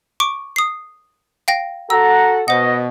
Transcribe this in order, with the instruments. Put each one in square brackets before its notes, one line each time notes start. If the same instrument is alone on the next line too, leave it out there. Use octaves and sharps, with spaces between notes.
[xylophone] C#6 D6 D7
D#6 C7
F5 G5 A#6
[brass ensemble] F#4 A4 F#5 [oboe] A#5 [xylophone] E6
[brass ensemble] B2 [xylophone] C5 F#5 [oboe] D#5